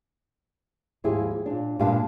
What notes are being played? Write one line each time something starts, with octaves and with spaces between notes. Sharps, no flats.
D#2 G#2 F3 E4 G4 G#4
A#2 D4
G2 A#2 G#3 D4 F5 A5